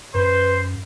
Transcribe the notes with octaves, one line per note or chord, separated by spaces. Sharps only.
F#2 B4 C5